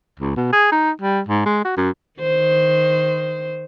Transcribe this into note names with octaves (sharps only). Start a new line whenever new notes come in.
C#2
B2
G#4
D#4
G3
G#2
G#3
F#4
F#2
D#3 C5